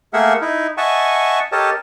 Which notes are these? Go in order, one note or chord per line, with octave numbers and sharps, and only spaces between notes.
A3 A#3 G#4 A#4 E5 F#5
D#4 E4
D#5 E5 F#5 G#5 A5 C#6
G4 A4 A#4 C#5 D#5 A5